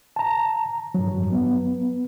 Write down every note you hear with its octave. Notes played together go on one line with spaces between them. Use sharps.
A5 A#5
G2 F#3
B3